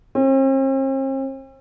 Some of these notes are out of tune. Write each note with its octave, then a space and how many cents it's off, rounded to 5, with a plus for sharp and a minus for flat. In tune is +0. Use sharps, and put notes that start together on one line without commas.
C4 +45